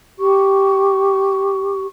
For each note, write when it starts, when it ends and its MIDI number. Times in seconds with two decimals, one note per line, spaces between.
0.19 1.86 67
0.19 1.86 85